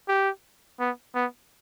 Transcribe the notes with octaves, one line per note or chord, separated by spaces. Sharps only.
G4
B3
B3